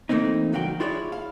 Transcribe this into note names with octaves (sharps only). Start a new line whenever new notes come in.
E3 A3 A#3 C4 D#4
C#2 G2 F#3 F#4 F5 G5
E4 F4 G#4 B4 C#5 D5
F5